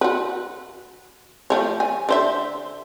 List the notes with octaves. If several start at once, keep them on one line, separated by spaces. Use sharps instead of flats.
F#4 B4
F3 A3 C#5
G#5
D3 C5 E5